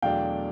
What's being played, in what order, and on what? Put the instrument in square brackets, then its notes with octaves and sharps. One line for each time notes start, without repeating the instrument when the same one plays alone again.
[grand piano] E2 B2 F#3 A3 D4 [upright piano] F5 G5